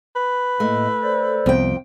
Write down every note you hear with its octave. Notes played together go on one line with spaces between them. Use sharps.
B4
A2 A3 A#3 D#5
A4 C5 D5
C2 F2 B3 G5